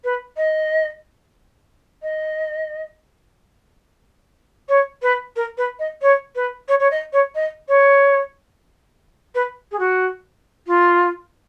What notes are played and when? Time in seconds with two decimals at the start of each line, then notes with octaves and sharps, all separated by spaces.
0.04 B4
0.37 D#5
2.03 D#5
4.69 C#5
5.02 B4
5.36 A#4
5.58 B4
5.79 D#5
6.02 C#5
6.36 B4
6.68 C#5
6.80 C#5
6.91 D#5
7.13 C#5
7.35 D#5
7.68 C#5
9.35 B4
9.72 G#4
9.79 F#4
10.67 F4